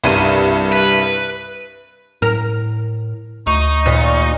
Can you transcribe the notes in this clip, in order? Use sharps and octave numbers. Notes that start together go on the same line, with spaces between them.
C2 G2 D#7
B4
A2 A#4
D2 D#4 C#6
D#2 A#2